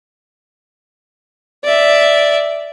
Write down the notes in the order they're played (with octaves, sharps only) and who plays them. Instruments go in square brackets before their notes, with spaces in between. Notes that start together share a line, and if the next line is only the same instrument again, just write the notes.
[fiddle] D5 E5